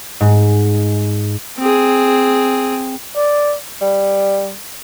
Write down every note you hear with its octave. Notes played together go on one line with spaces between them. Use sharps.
G#2
C4 G#4
D5
G3